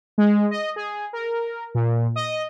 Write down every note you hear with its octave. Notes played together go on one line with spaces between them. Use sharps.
G#3
D#5
G#4
A#4
A#2
D#5